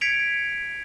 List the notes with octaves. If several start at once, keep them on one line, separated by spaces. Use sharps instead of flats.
G#6 B6 C#7 D7 F7